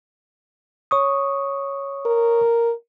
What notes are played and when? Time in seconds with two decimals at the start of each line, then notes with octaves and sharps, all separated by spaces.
0.91 C#5 C#6 D#6
2.06 A#4